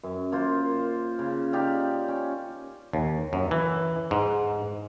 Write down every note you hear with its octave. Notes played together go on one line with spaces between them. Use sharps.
F#2
A#3 F4 C5
C#3
D#4 G4 D5 F5
C#4
D#2
F#2
E3
G#2